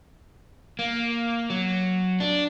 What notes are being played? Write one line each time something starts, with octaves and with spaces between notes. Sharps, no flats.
A#3
F#3
D4